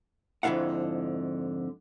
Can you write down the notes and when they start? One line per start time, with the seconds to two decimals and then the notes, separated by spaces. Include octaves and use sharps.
0.43 F2 G#2 D3 E4 F5 F#5